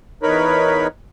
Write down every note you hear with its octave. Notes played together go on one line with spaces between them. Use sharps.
E2 D#4 A#4 B4 C#5 B5